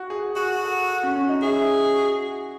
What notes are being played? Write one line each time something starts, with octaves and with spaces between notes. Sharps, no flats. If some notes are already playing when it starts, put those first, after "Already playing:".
Already playing: F#4
G#4
F#4 G#4
A4
C#4
C#4
D#4
E4 G#4
F#4